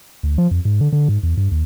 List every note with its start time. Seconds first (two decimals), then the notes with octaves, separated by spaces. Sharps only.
0.23 D2
0.38 F3
0.51 F2
0.65 G#2
0.81 D3
0.93 D3
1.09 G#2
1.23 E2
1.37 G2
1.51 D#2